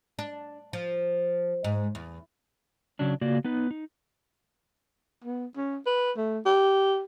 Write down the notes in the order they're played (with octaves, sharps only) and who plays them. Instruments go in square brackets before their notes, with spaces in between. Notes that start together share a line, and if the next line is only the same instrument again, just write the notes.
[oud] D4
F3
G#2
E2
[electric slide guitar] C#3 F#3 C#4 D4
C#3 A#3 F4 F#4 D5
B3 D#4 B4
D#4
[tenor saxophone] B3
C#4
B4
A3
G4